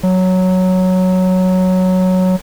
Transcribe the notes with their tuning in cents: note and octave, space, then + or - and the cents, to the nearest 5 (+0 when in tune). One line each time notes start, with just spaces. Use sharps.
F#3 +0